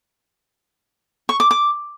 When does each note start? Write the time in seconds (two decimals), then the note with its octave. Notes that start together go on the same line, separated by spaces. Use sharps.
1.29 C#6
1.40 D6
1.51 D6